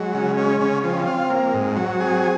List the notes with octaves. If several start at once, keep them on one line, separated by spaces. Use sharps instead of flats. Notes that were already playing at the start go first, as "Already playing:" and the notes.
Already playing: F#3 G#3
C#3
C#4
C#3
F3 C4
F4
A#3
G#2
F#3 C4
G#4